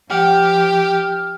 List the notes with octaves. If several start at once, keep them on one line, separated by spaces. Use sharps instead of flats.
F3 G4 F#5 G5 F6